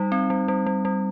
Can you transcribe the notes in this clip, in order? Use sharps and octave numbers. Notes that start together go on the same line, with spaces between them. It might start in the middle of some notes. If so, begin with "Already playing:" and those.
Already playing: G3 D#4
C4
G3
G3
G3
G3